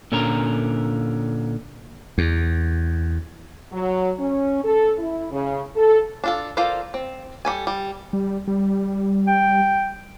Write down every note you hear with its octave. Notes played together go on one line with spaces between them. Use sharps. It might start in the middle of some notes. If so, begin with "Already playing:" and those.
A#2 D3 C#4 A#4 A#5
E2
F#3
C#4
A4
E4
C#3
A4
D4 F4 A4
F4 A4 A#4 C5 D5
C4
G3 A4 G#5
G3
G3
G3
G5